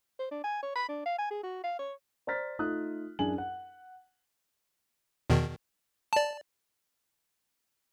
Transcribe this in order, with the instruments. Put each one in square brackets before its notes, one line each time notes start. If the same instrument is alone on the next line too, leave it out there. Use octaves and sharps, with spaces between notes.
[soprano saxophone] C5
D4
G#5
C#5
B5
D4
F5
G#5
G#4
F#4
F5
C#5
[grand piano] C5 D5 A#5 F6 A6 B6
A3 D#4 F4 D#6 F#6
F#2 D4 E4 G#4 G#5 F#7
F#5
[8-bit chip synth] E2 B2 D#3
D5 A5